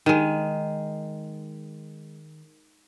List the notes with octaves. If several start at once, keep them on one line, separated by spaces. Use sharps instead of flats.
D#3 G#3